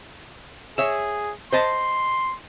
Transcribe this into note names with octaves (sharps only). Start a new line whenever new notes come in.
G#4 C#5 E5
C5 D#5 A5 C6